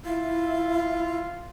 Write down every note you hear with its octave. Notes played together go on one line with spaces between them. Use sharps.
E4 F4